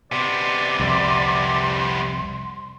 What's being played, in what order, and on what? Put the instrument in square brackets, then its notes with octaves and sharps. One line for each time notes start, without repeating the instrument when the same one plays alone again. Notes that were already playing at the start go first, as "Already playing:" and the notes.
[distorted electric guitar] C3 B3 [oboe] D5 [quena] C6
[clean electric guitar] C2 F2